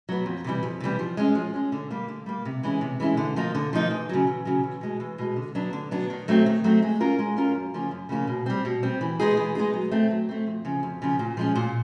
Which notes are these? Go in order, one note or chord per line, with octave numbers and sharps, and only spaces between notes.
F#3 B3
F2
C3 E3 G3
F2
C3 E3 G3
F3
G#3 C#4
F3
G#3 C#4
D3
G3 A#3
D3
G3 A#3
C3
E3 G#3 C#4 E4
C3
E3 G#3 C#4 E4
D3
F3 A#3 D#4
D3
F3 A#3 D#4
E2
C#3 F#3
E2
C#3 F#3
E2
B2 G#3
E2
B2 G#3
D3
F#3 B3 D4
D3
F#3 B3 D4
D#3
F#3 A3 C4
D#3
F#3 A3 C4
G#3
C#4 F4 A#4
G#3
C#4 F4 A#4
F#2
C#3 F3 A#3 C#4
F#2
C#3 F3 A#3 C#4
B2
G3 C4
B2
G3 C4
E3
G#3 B3 D#4 G#4
E3
G#3 B3 D#4 G#4
F#3
A3 C4
F#3
A3 C4
F2
C#3 F3
F2
C#3 F3
A#2
F3 G#3 C#4
A#2